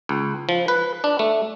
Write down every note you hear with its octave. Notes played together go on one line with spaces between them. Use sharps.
C#2
F3
B4
D4
A3